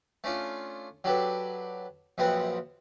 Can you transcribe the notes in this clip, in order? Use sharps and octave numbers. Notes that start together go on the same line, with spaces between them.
A3 C#4 D4 F4
F#3 D4 G4 A4 B4
A#1 F#2 B3 C4 F#5